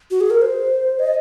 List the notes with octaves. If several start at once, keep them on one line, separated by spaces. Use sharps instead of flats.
F#4
G#4
A#4
C5
D#5